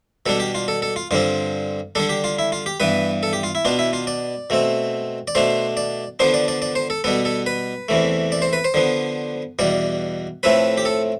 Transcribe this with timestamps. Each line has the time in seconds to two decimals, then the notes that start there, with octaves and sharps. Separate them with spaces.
0.26 B2 G3 D4 A4
0.40 G4
0.55 F4
0.68 A4
0.82 A4
0.96 F4
1.11 G2 D3 G3 C4 F4
1.95 D3 G3 D4 A4
2.09 G4
2.24 F4
2.39 E4
2.52 F4
2.66 G4
2.80 G2 E3 B3 B4
3.23 A4
3.33 G4
3.43 F4
3.55 E4
3.65 B2 B3 D4 F4
3.79 E4
3.93 F4
4.07 D5
4.50 B2 A3 C4
5.28 D5
5.35 B2 A3 D4 C5
5.77 D5
6.19 D3 F3 B3 D4 C5
6.34 D5
6.48 D5
6.62 D5
6.75 C5
6.90 A4
7.04 B2 G3 B3 A4
7.25 A4
7.46 B4
7.89 E2 C3 E3 A3
8.32 D5
8.42 C5
8.53 B4
8.64 C5
8.74 D3 F3 B3
9.59 E2 B2 G3 D5
10.43 A2 F3 A3 C4 B4
10.78 G4
10.85 A4